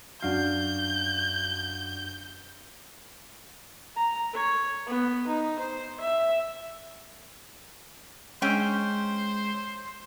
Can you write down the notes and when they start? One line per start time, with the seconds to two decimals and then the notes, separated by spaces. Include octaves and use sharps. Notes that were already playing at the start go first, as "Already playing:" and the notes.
0.22 F#2 D4 F#4 F5 G6
3.96 A#5
4.33 C#5
4.86 B3
5.27 D#4
5.59 C5
6.00 E5
8.42 G#3 C#4 C5 C#5 G5 E6